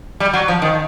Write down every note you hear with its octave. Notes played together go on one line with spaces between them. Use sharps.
G3
F#3
F3
D#3